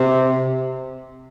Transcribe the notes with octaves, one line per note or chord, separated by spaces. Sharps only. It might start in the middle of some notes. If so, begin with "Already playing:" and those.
Already playing: C3